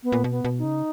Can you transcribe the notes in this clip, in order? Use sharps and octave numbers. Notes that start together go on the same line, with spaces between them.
B3
A#2
B2
B3
B2
D#4
C#3